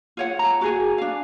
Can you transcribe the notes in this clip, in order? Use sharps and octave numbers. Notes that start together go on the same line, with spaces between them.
F4 C#5 F#5
A#5
F#4 G#4 G#5
D4 F5